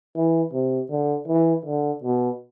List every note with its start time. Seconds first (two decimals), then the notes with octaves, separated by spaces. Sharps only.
0.16 E3
0.53 C3
0.91 D3
1.28 E3
1.66 D3
2.04 B2